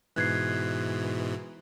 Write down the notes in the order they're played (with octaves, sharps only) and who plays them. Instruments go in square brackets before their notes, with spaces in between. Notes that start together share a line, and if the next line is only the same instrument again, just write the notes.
[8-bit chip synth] G#2 B2 E3 [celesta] F#6 G#6 C7